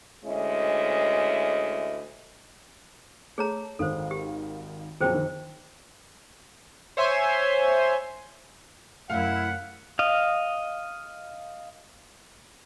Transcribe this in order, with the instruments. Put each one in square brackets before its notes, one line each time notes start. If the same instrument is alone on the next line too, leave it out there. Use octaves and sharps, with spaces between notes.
[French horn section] D2 G#3 C#4 E4 D#5
[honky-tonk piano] A3 [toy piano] G#4 C#5 A#5
[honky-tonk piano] G#1 D#3 F5 [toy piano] A4 C5
[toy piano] G4
[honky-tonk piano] B1 F#2 F3 [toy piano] G#4 C5 G5
[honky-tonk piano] D#3
[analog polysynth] C5 C#5 E5 G#5 C6
[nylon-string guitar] F#2 C3 A3 [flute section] E4 [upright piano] F5 [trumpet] F#5
[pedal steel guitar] D#5 F5